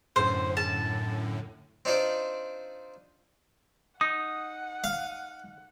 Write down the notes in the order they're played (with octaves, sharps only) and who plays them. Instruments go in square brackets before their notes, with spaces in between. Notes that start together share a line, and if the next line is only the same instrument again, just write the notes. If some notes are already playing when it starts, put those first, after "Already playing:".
[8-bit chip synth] F#2 A2 D3 [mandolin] C5
[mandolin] A5
[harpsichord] C4 D4 D#4 F4 C5 D5
[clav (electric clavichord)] D#4 [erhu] F#5 [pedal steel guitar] D#6
[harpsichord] F5